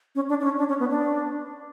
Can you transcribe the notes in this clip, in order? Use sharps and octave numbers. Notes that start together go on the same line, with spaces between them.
C#4
D4
D4
C#4
D4
C#4
B3
D4